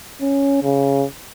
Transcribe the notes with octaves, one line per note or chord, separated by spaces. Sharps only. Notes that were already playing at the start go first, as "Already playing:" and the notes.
C#4
C#3